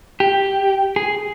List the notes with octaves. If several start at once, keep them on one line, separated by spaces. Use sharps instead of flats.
G4
G#4